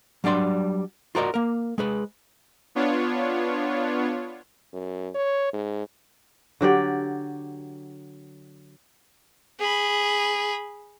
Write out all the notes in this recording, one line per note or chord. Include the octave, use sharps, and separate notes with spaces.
F#3 G3 D4 D5 C6
F4 F#4 A#4 C5 D5 D#5
A#3 A#4
G#3 G#4 B4
B3 D4 F4 C#5
F#2
C#5
G#2
D3 F#3 G4 D5
G#4 B5